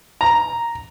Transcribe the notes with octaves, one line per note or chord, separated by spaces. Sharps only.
A#5